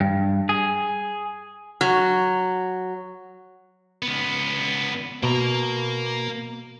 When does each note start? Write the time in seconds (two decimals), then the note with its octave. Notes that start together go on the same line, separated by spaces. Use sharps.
0.01 G2
0.49 G#4
1.81 F#3
4.02 C#2 B3
5.23 B2 A#3 A#5